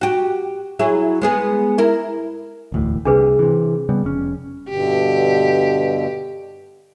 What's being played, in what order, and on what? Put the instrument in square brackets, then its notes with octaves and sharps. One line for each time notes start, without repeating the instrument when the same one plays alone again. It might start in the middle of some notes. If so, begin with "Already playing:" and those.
[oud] F#4 G4
F#3 E4 G#4
G#3 B3 G#4
E4 A#4
[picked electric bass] E1 D2 A2
[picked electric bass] C2 C3 [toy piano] D4 G#4 B4
[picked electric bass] C3 E3
C#3 G3 B3
F1 C#4
[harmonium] G2 B2 D3 [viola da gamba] G4